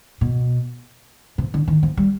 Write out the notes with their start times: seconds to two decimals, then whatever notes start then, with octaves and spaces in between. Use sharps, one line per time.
0.21 B2
1.38 C3
1.54 D3
1.68 D#3
1.83 F3
1.97 G3